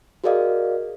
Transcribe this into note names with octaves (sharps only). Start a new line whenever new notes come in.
F#4 G#4 A#4 D5 D#5 F5